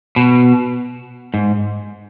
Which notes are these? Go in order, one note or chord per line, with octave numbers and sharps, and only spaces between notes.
B2
G#2